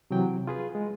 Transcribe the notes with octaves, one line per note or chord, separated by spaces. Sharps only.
C3 E3 F#3 G5
F4 G#4 B4
G#3